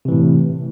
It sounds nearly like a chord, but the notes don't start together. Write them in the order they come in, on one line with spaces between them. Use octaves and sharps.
C3 E3 A2